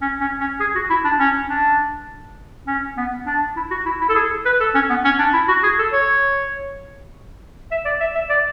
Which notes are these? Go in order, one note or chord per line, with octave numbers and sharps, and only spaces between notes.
C#4
C#4
C#4
G#4
F#4
E4
D4
C#4
D4
C#4
B3
D4
E4
F#4
E4
E4
A4
G#4
B4
A4
C#4
B3
C#4
D4
E4
F#4
G#4
A4
C#5
E5
D5
E5
E5
D5